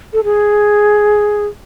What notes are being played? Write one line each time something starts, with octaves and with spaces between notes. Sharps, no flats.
A4
G#4